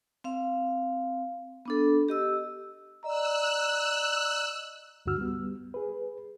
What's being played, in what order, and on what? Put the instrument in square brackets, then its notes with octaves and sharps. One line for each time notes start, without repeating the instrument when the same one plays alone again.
[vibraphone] C4 F5
B3 D4 A4
G4 D#5 E6
[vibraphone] D5 D#5 A#5 [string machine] E6 F#6
[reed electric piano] D2 G2 D3 F#4 E6 F6
G3 B3
G#4 B4